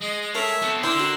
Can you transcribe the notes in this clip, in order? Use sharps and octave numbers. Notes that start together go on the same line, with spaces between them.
G#3 D#5
D#5
A4 A#4 C#5 E5
B3 C4 A4
D3 E4 A#4 D5 G5 C6 E6
F#4 B5